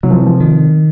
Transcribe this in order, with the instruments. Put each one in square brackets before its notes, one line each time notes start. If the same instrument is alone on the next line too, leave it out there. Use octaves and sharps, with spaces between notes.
[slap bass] C3 [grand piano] F#3
[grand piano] F3
E3
F3
[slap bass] D#3